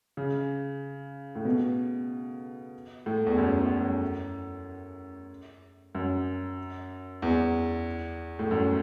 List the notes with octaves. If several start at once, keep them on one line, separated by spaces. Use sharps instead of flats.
C#3
A2
B2
A2
E2
F#2
E2
F#2
F#2
E2
A2
F#2